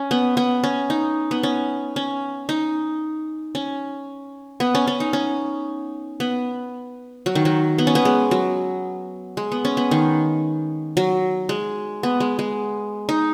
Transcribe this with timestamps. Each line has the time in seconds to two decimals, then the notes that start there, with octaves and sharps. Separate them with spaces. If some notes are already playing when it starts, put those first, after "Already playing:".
Already playing: C#4
0.11 B3
0.37 B3
0.64 C#4
0.90 D#4
1.31 B3
1.43 C#4
1.96 C#4
2.49 D#4
3.55 C#4
4.60 B3
4.75 C#4
4.87 C#4
5.00 D#4
5.13 C#4
6.20 B3
7.26 F#3
7.35 D#3
7.45 F#3
7.78 B3
7.87 C#4
7.95 B3
8.05 G#3
8.31 F#3
9.37 G#3
9.52 B3
9.65 C#4
9.77 B3
9.91 D#3
10.97 F#3
11.49 G#3
12.03 B3
12.20 G#3
12.39 G#3
13.09 D#4